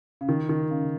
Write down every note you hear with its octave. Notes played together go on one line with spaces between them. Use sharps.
C#3
D#3
D#3
C#3